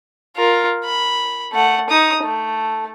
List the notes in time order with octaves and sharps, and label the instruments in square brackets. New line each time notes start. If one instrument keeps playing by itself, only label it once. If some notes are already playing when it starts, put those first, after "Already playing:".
[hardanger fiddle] F4 A#4
B5
A3 F#5
D#4 D#6
A3